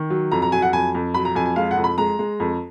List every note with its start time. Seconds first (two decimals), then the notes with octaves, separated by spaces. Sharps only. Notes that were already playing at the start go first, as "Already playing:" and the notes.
Already playing: D#3
0.10 F#3
0.32 F2 A#5
0.42 A#5
0.52 F#3 G#5
0.62 F#5
0.73 F2 G#5
0.95 F2
1.14 F#3 B5
1.25 A#5
1.35 F2 G#5
1.46 G#5
1.56 G#3 F5
1.71 F#5
1.77 F2
1.84 B5
1.98 G#3 A#5
2.19 G#3
2.40 F2